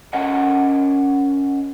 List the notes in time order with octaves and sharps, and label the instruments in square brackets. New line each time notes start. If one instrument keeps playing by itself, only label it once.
[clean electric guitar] C#4 A#4 C#5 D#5 F#5